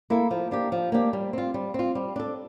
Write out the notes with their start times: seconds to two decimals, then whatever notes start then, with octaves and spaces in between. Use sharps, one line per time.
0.10 A#3 E4 A4
0.31 F3
0.51 A#3 D4 G4
0.72 F3
0.92 A#3 D4 G4
1.13 G3
1.33 C4 F4
1.54 G3
1.74 C4 F4
1.95 G3
2.16 D4 A4